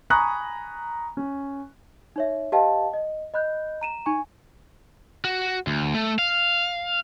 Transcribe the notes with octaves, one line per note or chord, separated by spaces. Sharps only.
G#5 A#5 B5 C#6 D#6 F#6
C#4
D#4 C#5 E5
G4 B4 D#5 F5 G5 A5
D#5
D#5 B5 F#6 G6
A#5 D#7 E7
D#4 G#5 C#6
F#4
D2
A3
F5